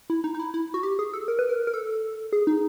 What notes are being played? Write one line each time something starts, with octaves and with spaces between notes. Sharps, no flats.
E4
D#4
D#4
E4
E4
F#4
G4
G#4
A4
A#4
B4
A#4
A#4
A4
G#4
D#4